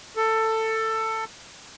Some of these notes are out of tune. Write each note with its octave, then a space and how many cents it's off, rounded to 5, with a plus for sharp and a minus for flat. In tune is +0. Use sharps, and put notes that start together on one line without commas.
A4 +15